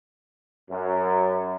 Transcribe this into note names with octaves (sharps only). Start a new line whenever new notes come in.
F#2